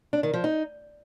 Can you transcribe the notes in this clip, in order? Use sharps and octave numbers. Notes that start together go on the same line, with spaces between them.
D4
D#3
F3
D#4